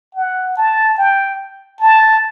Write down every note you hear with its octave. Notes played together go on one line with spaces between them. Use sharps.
F#5
A5
G5
A5